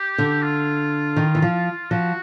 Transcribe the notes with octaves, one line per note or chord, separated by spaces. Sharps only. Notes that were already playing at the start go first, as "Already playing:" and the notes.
Already playing: G4
D3
F4
D#3
E3
F3
F3 F#4